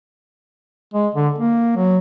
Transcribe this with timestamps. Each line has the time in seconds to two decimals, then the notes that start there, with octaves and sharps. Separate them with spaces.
0.94 G#3
1.15 D3
1.38 A#3
1.76 F#3